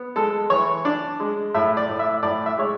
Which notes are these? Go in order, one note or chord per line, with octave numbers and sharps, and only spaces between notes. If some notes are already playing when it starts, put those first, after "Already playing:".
Already playing: B3
G#3 A4
E3 C#5
D4 D5
G#3
A2 E5
D5
A2
E5
A2 D5
E5
G#3 C#5